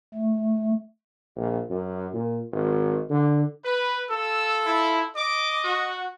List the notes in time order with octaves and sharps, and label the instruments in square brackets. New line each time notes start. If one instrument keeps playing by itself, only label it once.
[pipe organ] A3
[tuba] A#1
F#2
A#2
G#1
D3
[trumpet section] B4
[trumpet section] F4 A4 [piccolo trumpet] E6
[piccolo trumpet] E4
[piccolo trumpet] D#5 [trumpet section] D6
[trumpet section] F#4